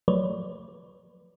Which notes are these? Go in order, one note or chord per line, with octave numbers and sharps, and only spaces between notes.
F3 F#3 A3 B4 C#5 D5